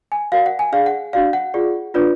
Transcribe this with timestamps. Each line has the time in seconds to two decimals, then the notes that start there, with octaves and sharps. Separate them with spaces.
0.12 G#5
0.32 F#4 A#4 D5 F5
0.46 F#5
0.59 G#5
0.72 D4 G#4 D5 F5
0.86 F#5
1.13 D4 F#4 D5 F5
1.33 F#5
1.54 F4 G#4 D5
1.94 D4 F4 B4 D5